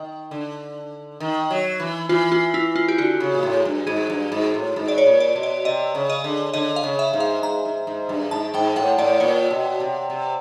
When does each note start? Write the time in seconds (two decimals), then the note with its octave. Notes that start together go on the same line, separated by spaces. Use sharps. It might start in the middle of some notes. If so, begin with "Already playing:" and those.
Already playing: D#3
0.31 D3
1.20 D#3
1.50 F#3
1.80 E3
2.09 E3 F4
2.32 F4
2.54 E4
2.76 F4
2.88 G4
2.98 D3 F#4
3.20 C#3
3.34 A#2
3.43 A2
3.65 G2
3.87 G#2 G#4
4.10 G2
4.32 G#2
4.54 A2
4.76 G#2
4.88 D5
4.98 C#5
5.06 A#2
5.20 D5
5.36 B2
5.43 D5
5.65 C3 D#5
5.95 C#3
6.10 D#5
6.24 D3
6.54 D3 D#5
6.76 F5
6.83 C#3
6.99 E5
7.13 G#2
7.20 F5
7.43 G#2 A#5
7.65 G#2
7.87 G#2
8.09 G2
8.31 G#2 A5
8.54 G#2 G5
8.76 A2 F#5
8.98 A2 D5
9.20 A#2 C#5
9.51 B2
9.80 C3
10.10 C3